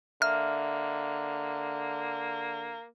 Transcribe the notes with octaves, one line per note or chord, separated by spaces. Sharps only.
D3 A#3 E5 F6